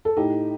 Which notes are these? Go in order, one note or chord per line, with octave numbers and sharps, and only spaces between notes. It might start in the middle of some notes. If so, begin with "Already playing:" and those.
A4
A2 D#4 G4